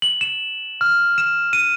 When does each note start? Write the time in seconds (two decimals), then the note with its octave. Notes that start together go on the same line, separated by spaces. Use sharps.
0.02 F#7
0.21 E7
0.81 F6
1.18 E7
1.53 D#7